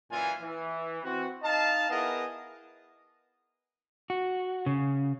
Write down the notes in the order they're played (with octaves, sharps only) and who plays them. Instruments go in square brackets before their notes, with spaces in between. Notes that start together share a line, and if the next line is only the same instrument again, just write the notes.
[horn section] F#2 A#2 E3 F4 G#5
E3
E3 C4 F#4
D#4 D#5 F5 A5
B3 E4 G#4 A#4 D#5
[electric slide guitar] F#4
C#3